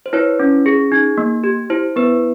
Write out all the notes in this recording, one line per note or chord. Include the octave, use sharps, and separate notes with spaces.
C5
E4 B4 C#5
C#4
G#4
D#4
A#3
G4
E4 C5
B3 B4